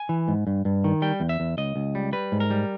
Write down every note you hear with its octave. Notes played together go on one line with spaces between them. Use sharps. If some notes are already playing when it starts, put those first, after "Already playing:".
Already playing: G#5
E3
G#2
G2
G2
D#3
G3 G5
E2
E5
E2
C#2 D#5
C#2
G3
G3 B4
G#2
A#4
G3